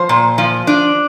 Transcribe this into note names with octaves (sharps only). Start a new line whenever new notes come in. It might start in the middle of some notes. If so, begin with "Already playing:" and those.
Already playing: F3 C5
A#2
F3
D4